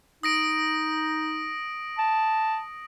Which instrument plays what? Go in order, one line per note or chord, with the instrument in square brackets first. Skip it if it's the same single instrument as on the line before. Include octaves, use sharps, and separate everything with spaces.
[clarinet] D#4 [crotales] D#6 A#6 D7
[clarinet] A5